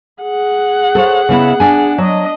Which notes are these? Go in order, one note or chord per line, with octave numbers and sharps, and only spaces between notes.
G#4 F#5
A4 C5 C#5
C#3 B3 E4
D4 G#5
F#3 D4 D#5